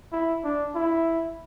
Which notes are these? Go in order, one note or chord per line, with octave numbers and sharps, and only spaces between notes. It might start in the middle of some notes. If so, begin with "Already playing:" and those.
E4
D4
E4